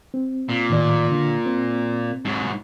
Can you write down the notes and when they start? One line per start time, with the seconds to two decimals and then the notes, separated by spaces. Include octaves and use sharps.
0.14 C4
0.49 A#2
0.70 A2 D#3 D5
1.11 D3
1.46 C4
2.25 G#2 F#3